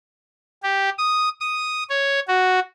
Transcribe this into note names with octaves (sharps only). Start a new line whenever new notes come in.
G4
D#6
D#6
C#5
F#4